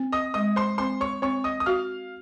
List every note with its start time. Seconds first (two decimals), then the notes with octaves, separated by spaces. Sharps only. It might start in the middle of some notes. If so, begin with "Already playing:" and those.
Already playing: C4
0.12 D#5 D#6
0.34 G#3 D#5 D#6
0.56 C5 C6
0.78 C4 C5 C6
1.01 C#5 C#6
1.22 C4 C#5 C#6
1.44 D#5 D#6
1.60 D#6
1.66 F#4 F5 F6